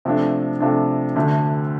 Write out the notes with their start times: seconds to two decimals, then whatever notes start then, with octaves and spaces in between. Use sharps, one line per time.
0.05 C3 F3 A3 D4
0.60 C3 F3 A3 D4
1.16 D2 D3 A3